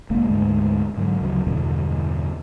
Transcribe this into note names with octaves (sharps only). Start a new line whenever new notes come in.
E1 D2 G#3 A#3
D2 G#2 G#3
G#2 D3 F#3
D2 C#3 F#3
E2 G2 B2 D3